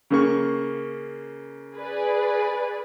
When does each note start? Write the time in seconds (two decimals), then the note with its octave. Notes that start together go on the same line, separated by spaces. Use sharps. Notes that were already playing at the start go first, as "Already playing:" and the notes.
0.10 C#3 A#3 C#6
1.75 G#4 B4 D5